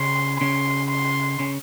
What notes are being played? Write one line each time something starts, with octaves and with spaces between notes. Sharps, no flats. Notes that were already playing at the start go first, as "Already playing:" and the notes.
Already playing: C#3 C#4 C6
C#3 C#4 C6
C6
C#3 C#4